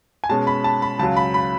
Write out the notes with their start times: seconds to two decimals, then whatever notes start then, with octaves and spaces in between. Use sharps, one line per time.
0.24 G#5
0.29 B2 G#3 C#4 A5
0.47 B5
0.64 A5
0.82 B5
0.99 C#2 C#3 F#3 A5
1.16 B5
1.34 B5